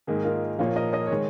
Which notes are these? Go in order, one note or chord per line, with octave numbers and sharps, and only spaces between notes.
G#2 D#3 A#3 D#4 G#4
F4 A#4
A#2 F3 A#3 C#5 F5
A#4 D#5
D#5
D#3 G#3 C#5